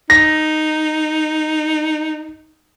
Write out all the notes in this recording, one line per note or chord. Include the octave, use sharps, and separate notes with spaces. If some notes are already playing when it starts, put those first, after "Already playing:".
D#4 A#6